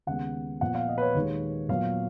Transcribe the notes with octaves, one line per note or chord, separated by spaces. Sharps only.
D#2 C#3 G#3 B3 F#5
A#2 F3 B3 F#5
F5
D#5
B4
C#5
D#2 D#3 G#3
A#2 F#3 B3 F5